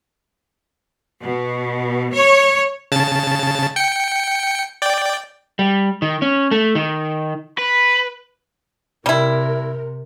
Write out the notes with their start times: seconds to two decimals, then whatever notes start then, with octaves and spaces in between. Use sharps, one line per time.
1.21 B2
2.13 C#5
2.92 C#3 A5 A6
3.76 G5 C#7
4.82 D5 G5
5.59 G3
6.02 D#3
6.22 C#4
6.51 A3
6.75 D#3
7.58 B4 B5
9.06 C3 G3 E4 A#4